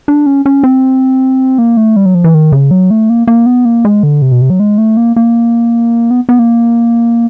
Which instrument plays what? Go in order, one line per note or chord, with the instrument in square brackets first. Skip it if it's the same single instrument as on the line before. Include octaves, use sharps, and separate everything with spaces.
[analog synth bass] D4
C#4
C#4
C4
A#3
A3
G3
F#3
F3
E3
D#3
C#3
F#3
A3
A#3
A#3
B3
A#3
G#3
D3
C3
B2
C3
F#3
G#3
A3
A#3
A#3
B3
B3
A#3